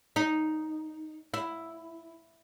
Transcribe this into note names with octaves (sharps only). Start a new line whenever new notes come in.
D#4
E4